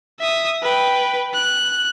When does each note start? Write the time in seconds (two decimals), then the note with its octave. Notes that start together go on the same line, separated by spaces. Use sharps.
0.20 E5 D#6
0.63 B4 G5
1.34 F#6